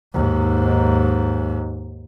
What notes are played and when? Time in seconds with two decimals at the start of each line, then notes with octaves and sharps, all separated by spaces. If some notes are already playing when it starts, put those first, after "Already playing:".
0.14 D#2 G#2